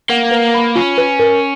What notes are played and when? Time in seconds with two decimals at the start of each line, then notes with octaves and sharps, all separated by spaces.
0.10 A#3 F#5
0.31 B4
0.54 B5
0.76 C#4 F4
0.98 B4
1.19 A#4